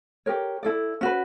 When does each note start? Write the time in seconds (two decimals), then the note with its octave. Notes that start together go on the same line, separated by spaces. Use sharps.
0.26 G4 A#4 C#5
0.63 E4 A4 D5
1.01 C#4 F#4 B4